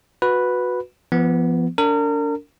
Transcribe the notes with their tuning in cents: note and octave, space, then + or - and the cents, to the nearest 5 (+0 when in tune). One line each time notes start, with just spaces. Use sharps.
F#4 -20 B4 +0
F3 -30 B3 +0
D4 -30 A#4 -35